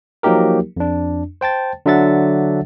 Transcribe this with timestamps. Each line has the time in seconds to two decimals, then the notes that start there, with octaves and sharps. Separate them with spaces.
0.23 F3 F#3 A#3 D#4 G4 A#4
0.77 F2 D4
1.41 C5 G5 A5 A6
1.86 D3 F#3 D4 E5 F#5 A6